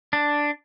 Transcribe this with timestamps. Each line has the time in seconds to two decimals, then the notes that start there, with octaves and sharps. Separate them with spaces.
0.13 D4